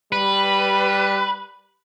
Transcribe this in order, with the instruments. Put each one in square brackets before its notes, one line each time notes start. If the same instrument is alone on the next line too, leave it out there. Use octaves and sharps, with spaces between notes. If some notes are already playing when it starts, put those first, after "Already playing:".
[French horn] G3 [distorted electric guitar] B4